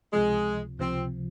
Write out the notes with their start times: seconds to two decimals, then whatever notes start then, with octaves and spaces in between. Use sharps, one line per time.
0.12 C#2 C3 F3 G#3
0.79 C#2 C3 F3 C4